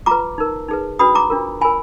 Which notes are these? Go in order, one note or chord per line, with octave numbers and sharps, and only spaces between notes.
F4 B4 A#5 D6
D#4 A#4
D#4 G#4 B4
D4 F#4 B4 B5 D#6
A#5 D6
D4 F4 A#4
F4 A#4 G#5 B5